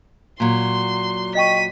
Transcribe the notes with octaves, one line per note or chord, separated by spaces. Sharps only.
A#2 F#3 C6
D#5 G5 C#6 B6 D#7